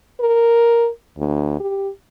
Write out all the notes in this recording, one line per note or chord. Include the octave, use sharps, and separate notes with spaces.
A#4
D2
G4